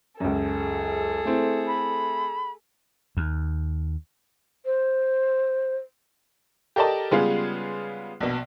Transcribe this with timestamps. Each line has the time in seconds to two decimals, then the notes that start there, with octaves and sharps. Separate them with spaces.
0.20 C#2 F#2 G#4 A4
1.25 A3 C4 E4
1.67 B5
3.17 D#2
4.66 C5
6.76 G4 A4 A#4 D5 D#5 A5
7.11 C#3 G3 G#3 B3 F4 G#4
8.20 A#1 B2